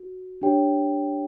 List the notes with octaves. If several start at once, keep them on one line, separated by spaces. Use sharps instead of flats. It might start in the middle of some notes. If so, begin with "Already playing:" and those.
Already playing: F#4
D4 G4 C#5 G5